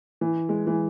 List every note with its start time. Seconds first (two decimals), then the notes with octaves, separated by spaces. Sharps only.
0.21 E3
0.49 G#3
0.67 E3